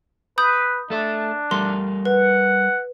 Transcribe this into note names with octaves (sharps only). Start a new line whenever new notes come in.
B4 B5 D#6 G6
A3 D4 A4 E5
G3 A4 A#4 C6
B4 F#5